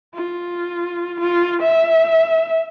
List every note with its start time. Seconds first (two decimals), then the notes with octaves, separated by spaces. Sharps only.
0.14 F4
1.21 F4
1.62 E5